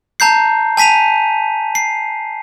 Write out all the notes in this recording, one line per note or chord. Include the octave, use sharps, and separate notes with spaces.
A5 A#5 G6 C7
G#5 A5 B6 D#7 F7
C7